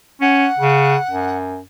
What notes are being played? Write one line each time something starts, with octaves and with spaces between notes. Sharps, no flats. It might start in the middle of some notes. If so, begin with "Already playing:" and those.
C#4 F#5
C#3
F#2